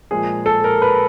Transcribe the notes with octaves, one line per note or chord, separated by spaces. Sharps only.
A#2 F3 G#3 G#4
A4
A#4
B4